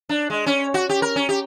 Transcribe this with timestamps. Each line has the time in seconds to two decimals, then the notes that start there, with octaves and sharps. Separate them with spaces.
0.09 D4
0.30 G#3
0.46 C#4
0.74 F#4
0.89 G4
1.02 A#4
1.16 C#4
1.29 G4